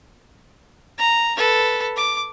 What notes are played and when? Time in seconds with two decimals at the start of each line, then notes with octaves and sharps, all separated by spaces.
0.98 A#5
1.37 A4 B4
1.96 D6